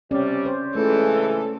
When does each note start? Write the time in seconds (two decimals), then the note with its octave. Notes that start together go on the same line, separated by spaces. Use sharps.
0.11 C3 G3 C#4 D5
0.46 C5
0.75 C#2 E3 G#3 A3 A4